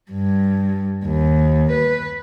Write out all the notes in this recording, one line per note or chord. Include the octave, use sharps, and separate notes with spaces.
G2
D#2
B4